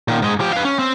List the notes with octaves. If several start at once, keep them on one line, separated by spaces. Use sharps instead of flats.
A#2 D#3
G#2 G#3
F3 G4
B4 F5
C#4
C4